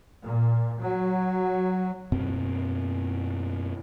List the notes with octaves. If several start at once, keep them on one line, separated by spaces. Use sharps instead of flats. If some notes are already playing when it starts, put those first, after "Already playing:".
A#2
F#3
F#2 B2 C4